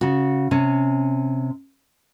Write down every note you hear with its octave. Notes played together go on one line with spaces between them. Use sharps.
C#3 F#4
C3 C#4